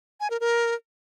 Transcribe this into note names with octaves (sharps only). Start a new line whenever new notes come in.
G#5
A#4
A#4